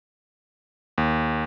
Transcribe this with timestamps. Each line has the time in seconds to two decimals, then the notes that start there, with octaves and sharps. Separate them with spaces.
0.98 D#2